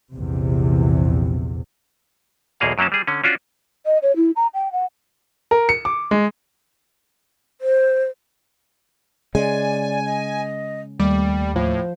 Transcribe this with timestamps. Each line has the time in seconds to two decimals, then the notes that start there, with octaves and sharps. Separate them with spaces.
0.12 A#1 E2 C3
2.60 B1 E2 B2 A#3 G#4 F5
2.78 F#2 F#3 A#3 C#4 A5
2.92 G3 G#4
3.07 D3 C#4
3.24 C#4 D4 F4 F#4
3.86 D#5
4.02 C#5
4.16 E4
4.36 A#5
4.54 G5
4.72 F#5
5.51 A#4
5.69 C#7
5.85 D6
6.11 G#3
7.61 C5
9.35 C#3 G#3 D5 G#5
10.05 D#5
10.99 D#2 G3 A3 G5 D6
11.56 A2 F3 C5